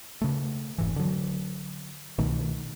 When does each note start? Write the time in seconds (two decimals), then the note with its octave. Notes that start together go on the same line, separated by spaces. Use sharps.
0.21 C#3 A3
0.78 F1 G#2 E3
0.96 D3 F#3
2.18 C2 B2 D#3 A3